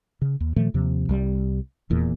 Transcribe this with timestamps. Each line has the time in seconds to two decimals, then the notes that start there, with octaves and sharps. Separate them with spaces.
0.22 C#3
0.40 D#2
0.56 A#2 D#3 F3 A3
0.74 D#2 C3 F3
1.09 C2 G3
1.90 D#1 E2 A#2